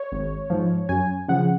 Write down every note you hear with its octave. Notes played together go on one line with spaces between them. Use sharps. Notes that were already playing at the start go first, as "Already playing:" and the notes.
Already playing: C#5
G#1
G#2 F3
F#2 G#5
C#3 F3 F#5